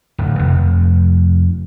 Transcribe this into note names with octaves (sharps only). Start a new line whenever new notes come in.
D1
F1